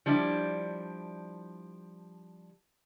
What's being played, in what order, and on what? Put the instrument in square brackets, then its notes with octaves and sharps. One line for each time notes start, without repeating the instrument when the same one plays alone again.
[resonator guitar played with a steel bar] F3 G3 D4 E4